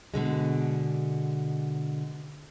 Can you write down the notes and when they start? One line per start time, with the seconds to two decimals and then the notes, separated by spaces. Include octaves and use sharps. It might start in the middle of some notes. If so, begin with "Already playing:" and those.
0.14 B2 D3 G#3